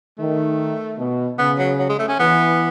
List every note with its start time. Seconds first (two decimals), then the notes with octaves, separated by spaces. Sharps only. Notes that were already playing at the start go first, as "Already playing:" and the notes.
0.18 D#3 A3
0.98 B2
1.38 C#3 B3
1.59 F#3
1.79 F#3
1.89 G#3
1.99 A3
2.08 C#4
2.19 E3 B3